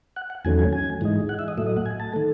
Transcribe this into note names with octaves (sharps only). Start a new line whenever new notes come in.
F#5
F#5
E2 D#3 F#3 A3 C#4 G#5
G#5
G#5
G#2 E3 G#3 D#4
F#5
E5
D#5
A2 F#3 A3 E5
D#5
F#5
G#5
A5
D#3 A3